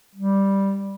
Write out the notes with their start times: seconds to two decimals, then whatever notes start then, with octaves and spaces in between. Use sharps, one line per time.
0.15 G3